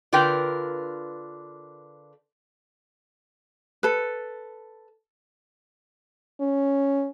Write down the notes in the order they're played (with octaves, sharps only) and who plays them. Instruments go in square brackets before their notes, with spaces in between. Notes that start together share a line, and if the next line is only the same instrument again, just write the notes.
[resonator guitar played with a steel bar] D3 F4 A#4 B4 G5
[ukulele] A4 B4
[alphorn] C#4